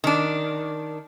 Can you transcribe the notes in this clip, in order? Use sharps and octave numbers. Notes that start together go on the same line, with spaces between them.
D#3 D4